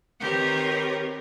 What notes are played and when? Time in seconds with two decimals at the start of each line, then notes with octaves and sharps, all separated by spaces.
0.19 D#3 C4 G4 A#4 B4 C#5